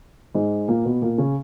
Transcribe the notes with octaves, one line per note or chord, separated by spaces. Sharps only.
G#2 G#3
A#2 A#3
B2 B3
A#2 A#3
C#3 C#4